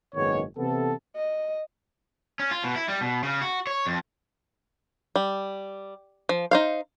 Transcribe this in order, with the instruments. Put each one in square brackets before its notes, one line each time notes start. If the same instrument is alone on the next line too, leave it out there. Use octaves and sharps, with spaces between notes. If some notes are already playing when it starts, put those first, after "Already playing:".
[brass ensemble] F#1 G#2 D#3 G#3 B3 C#5
C3 E3 B3 E4 A4
[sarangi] D#5
[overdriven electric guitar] C#4
F4
B2
E4
G3
B2
C#3
F#4
C#5
F2
[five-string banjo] G3
F3
D#4 C5 F5